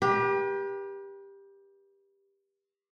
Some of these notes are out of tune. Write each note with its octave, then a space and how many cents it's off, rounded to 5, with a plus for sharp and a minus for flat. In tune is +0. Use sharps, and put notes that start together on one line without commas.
G4 +15 B4 -40